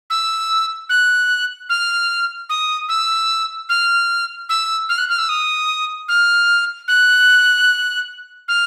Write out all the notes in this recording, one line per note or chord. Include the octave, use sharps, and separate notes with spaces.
E6
F#6
F6
D#6
E6
F6
E6
F6
F#6
F6
E6
D#6
F6
F#6
F6